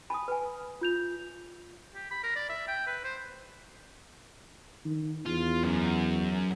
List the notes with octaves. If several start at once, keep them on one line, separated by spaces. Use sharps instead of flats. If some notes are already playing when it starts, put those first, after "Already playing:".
G#5 A5 B5 D#6
B4 G#5
F4 G6 F7
G4
B5
A#4
D5
E5
G5
B4
C5
D#3
E2 F4
F#2